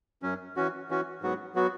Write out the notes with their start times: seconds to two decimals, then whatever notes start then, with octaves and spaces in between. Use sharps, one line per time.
0.22 F#2 F#3 C#4
0.56 E3 C#4 F#4
0.90 E3 C#4 F#4
1.22 G#2 F#3 B3 F#4
1.55 F#3 B3 F#4